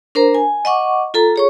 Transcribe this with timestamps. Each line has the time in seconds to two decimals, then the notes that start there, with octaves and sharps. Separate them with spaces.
0.15 D4 A#4 C5 A#5
0.35 G#5
0.65 D#5 F#5 C#6 D6
1.14 F4 A4 A#5
1.36 G#4 C#5 C#6